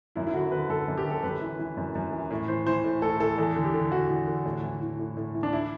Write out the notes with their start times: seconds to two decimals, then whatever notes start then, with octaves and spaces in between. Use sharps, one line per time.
0.16 F#2 E4
0.27 E4
0.34 D3 F#4
0.52 D3 B4
0.69 F#2 A4
0.88 F#2
0.97 G4
1.05 D3 A4
1.23 F#2 B4
1.41 E3
1.59 E3
1.77 F#2
1.95 F#2
2.13 E3
2.31 A2
2.48 E3 C5
2.67 E3 C5
2.84 A2
3.02 A2 A4
3.20 E3 A4
3.38 E2 A4
3.56 D3
3.65 G4
3.74 D3
3.92 E2 F#4
4.09 E2
4.27 D3
4.45 A2
4.63 E3
4.82 E3
4.99 A2
5.17 A2
5.35 E3
5.43 D4
5.53 E4